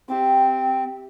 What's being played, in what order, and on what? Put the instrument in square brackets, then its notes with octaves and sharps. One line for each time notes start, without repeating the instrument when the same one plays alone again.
[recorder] C4 [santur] G4 E5 D6